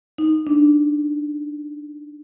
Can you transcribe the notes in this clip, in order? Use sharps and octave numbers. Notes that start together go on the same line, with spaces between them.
D#4
D4